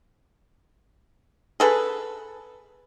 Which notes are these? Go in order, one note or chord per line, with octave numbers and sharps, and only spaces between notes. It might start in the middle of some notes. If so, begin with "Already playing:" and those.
G#4 A4 B4